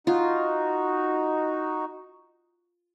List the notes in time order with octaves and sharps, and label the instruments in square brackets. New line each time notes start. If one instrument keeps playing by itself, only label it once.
[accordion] D#4 F#4 [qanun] F4